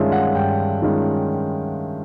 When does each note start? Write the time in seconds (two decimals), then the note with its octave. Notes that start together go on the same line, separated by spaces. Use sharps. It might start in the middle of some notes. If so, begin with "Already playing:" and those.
Already playing: G2 D#3 G#3 C#4 F4 E5 F5
0.12 F#5
0.35 G2 G5
0.82 D#3 G#3 C#4 F4